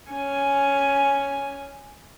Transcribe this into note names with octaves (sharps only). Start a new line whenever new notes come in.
C#4 G#5